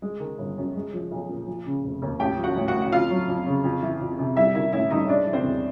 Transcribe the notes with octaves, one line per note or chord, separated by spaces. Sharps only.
G#3
D#3
G1
F#2
G#3
F3
B1
A#2
F3
C#3
F1
D#2
A1 G4 G5
F3
F#4 F#5
A1
F#4 F#5
A2
F#5
F2 F4 F5
F#3
F2
C#3
F2
E3
F2
C3
G3 E4 E5
D#3 E4 E5
A1 E4 E5
G2 D#4 D#5
G#3 D4 D5
E3
C4 C5
E2